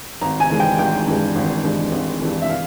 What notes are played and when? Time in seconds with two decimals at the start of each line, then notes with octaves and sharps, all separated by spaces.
0.21 G#1 A#5
0.40 G#5
0.50 G2 E3 G#3
0.60 G5
0.79 G#1 G5
1.07 G2 E3 G#3
1.36 G#1
1.64 G2 E3 G#3
1.92 G#1
2.21 G2 E3 G#3
2.42 E5
2.50 F5